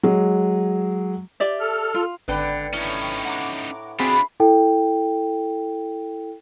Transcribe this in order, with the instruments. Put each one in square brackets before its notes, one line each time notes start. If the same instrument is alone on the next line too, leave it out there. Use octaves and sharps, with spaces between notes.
[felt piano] F#3 G#3
[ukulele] G4 D5 E5
[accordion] A4 F6
[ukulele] F4
[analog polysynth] G#1 G5 C#7 [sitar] D3 B4
[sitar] A2 [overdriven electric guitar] C#4 D#4
[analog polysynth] F#5 A#5 D6
[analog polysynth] C4 F#4 G#4 [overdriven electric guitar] D4 F4 [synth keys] B5
[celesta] E4 A4 G5